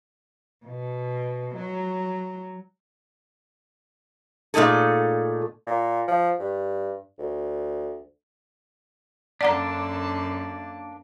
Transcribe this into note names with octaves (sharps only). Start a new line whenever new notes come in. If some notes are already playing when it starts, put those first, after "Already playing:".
B2
F#3
A#2 A3 D#4 G#4 A4
A#2
F3
G2
D2
F#2 D3 A#3 D4 D5 F#5 A5 A#5